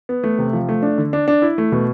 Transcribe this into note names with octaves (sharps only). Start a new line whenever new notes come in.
B3
A3
C3
F3
A3
D4
D3
D4
D4
E4
A3
B2